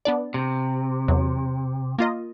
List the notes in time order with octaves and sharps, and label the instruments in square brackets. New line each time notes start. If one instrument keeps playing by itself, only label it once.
[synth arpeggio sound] B3 D4 D5
[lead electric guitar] C3
[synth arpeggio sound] E2 F#3
A#3 F4 D#5